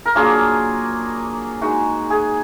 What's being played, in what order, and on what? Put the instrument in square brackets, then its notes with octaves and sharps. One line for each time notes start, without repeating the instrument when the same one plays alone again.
[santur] A#4
F#3 A#3 D4 F4 G#4
G#3 D#4 F#4
G#4